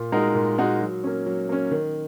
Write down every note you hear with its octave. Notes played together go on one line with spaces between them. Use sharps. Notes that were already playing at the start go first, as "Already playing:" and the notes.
Already playing: A#2
G#3 D#4 F#4 A#4
A#2
G#3 D#4 F#4 A#4
F#3
A#3 C#4
F#3
A#3 C#4
D#3